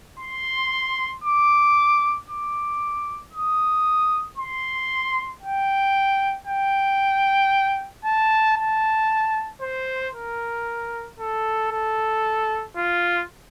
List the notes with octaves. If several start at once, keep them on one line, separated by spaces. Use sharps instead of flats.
C6
D6
D6
D#6
C6
G5
G5
A5
A5
C5
A#4
A4
A4
F4